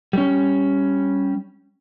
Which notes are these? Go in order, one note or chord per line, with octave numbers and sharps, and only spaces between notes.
G3 C#4